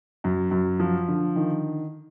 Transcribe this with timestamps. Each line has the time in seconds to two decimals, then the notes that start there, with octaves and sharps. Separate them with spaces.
0.24 F#2
0.51 F#2
0.79 F3
1.08 D3
1.36 D#3